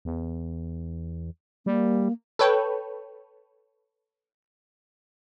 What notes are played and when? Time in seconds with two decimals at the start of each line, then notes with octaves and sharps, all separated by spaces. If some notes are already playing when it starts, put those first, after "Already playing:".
0.05 E2
1.66 G3 A#3
2.39 A4 B4 C#5 G5